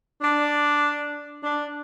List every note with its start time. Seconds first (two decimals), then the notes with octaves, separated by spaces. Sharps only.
0.22 D4
1.42 D4